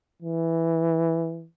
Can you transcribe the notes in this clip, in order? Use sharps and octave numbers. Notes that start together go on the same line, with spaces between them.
E3